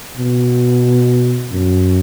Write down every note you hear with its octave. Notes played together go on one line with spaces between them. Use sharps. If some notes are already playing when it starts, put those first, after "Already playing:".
B2
F#2